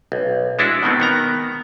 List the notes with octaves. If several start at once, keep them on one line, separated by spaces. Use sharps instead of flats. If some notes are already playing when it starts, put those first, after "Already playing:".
B1
G#3 D4 E4 F#4
B2 D#3 B3 C4
D#3 B3 A#5